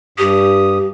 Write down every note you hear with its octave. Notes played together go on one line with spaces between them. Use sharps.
G2 G4 D#6